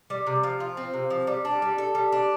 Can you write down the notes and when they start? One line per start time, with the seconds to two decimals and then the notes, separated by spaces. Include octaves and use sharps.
0.10 G3
0.26 C3
0.43 F3
0.60 F4
0.77 C4
0.93 C3
1.10 F3
1.27 G3
1.45 D4
1.62 G3
1.78 A4
1.95 G3
2.12 D4